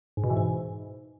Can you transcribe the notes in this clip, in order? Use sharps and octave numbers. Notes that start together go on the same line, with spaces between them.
G#2
B2
E3
G#2